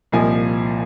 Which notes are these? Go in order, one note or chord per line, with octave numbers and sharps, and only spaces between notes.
C2 A#2 F3 D#5 G#5